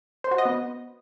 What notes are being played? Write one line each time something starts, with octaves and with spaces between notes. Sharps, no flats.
C5
F#4
D#5
B3